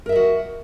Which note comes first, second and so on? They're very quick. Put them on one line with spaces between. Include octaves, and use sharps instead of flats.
A#4 E5 D#5 F#4